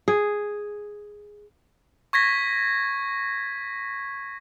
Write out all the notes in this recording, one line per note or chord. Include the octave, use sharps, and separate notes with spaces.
G#4
C#6 G#6 A#6 B6